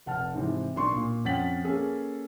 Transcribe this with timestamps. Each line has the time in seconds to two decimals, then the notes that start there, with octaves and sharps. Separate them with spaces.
0.06 F1 F#5 A5 F6
0.34 G#2 C3 E3
0.75 B1 D4 C6 C#6
0.92 A#2
1.25 F2 C#4 F#5 A6 B6 F#7
1.64 A#3 C#4 G#4 A4